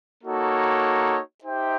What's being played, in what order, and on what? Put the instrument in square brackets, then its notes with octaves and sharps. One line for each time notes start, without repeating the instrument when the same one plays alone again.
[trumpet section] A#3 D#4 F#4 A4 C#5
D#4 G4 C5 E5 G5